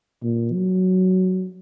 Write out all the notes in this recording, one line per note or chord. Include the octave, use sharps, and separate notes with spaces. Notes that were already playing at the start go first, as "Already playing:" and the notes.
A#2
F#3